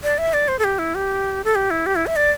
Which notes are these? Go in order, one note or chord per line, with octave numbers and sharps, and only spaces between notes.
D5
E5
D5
C5
A4
G4
E4
G4
A4
G4
E4
G4
E4
E5
D5